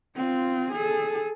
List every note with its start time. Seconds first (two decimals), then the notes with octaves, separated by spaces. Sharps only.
0.16 C4 F4
0.72 G#4 A4